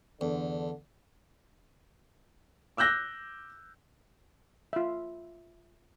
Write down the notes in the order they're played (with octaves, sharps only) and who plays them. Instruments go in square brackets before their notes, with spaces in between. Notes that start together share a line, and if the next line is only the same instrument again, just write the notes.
[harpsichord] E2 [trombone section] D3
[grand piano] D6 E6 F#6 G6 A#6
[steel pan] F4 E5